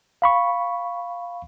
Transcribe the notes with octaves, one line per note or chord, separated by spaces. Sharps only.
F5 B5 C#6